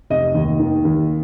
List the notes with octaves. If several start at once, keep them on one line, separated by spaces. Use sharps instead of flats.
F1 D#5
D#2
D#3
D#2